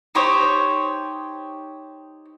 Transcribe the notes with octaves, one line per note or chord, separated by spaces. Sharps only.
D#4 G4 C5 C#5